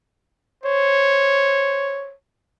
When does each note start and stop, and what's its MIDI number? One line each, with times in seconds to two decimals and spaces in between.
0.64 2.14 72
0.64 2.14 73